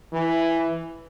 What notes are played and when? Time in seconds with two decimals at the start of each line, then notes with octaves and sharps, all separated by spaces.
0.13 E3